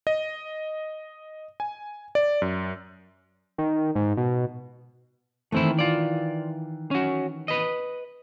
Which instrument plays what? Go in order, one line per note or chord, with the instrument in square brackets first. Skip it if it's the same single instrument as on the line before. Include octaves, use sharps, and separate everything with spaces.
[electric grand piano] D#5
G#5
D5
F#2
[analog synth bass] D#3
G#2
B2
[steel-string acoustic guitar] D#3 E3 [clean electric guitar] A3 C4 E4
[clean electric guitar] F4 D5
C#4 F#4
B4 D#5